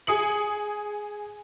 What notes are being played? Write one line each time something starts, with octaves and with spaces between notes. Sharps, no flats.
G#4 G#5 D#6 C#7 F#7